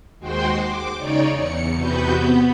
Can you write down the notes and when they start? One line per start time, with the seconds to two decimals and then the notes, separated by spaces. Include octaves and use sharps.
0.19 D#2 G#3 F#4 C5 G5 C6
0.58 D6
0.97 C#3 D#4 C#5 D5
1.31 E2 C#7
1.73 E2 C3 B3 F#4 B4 G6
2.18 B3